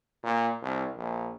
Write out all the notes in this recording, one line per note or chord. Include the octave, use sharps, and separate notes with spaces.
A#2
C2
A#1